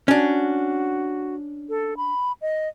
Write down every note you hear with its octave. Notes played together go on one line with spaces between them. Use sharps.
C#4 D4 F#4
A4
B5
D#5